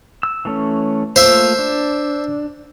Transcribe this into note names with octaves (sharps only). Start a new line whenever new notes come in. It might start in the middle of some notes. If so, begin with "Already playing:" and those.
E6
E3 A3 C#4
A3 A#3 F4 C5 E5
D4